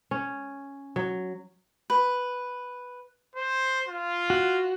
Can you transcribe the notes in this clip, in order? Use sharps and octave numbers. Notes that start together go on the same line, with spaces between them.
C#4
F#3
B4
C5
F4
F#4